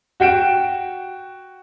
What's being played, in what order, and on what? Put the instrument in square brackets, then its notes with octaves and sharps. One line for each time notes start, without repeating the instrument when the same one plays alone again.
[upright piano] F#4 G5 D7 E7